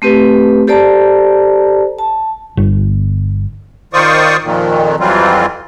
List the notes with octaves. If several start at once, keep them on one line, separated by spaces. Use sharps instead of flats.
A3 C4 G4 B4
G4 A4 C5 D5 A5 A#5
A5
G1
D#3 F4 C5 D5 C#6 D#6
F2 A#2 D#3
F2 E3 F#3 G3 C4 F4